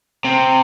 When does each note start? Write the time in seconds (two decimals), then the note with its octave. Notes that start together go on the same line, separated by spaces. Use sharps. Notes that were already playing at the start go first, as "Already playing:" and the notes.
0.25 C3